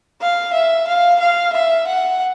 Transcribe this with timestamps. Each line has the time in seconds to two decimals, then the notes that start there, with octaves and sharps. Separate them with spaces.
0.21 F5
0.53 E5
0.87 F5
1.19 F5
1.53 E5
1.87 F#5